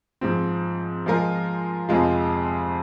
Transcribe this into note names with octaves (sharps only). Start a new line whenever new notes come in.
G#2 F3 C4
F3 G#3 F4 A#4
F2 C3 F3 G#3 F4